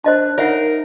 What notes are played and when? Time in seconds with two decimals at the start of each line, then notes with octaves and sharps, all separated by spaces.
0.04 D4 C5 D#5 A5
0.38 D#4 A#4 C#5 E5 F#5